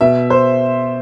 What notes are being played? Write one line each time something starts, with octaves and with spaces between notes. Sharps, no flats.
B2 E5
C5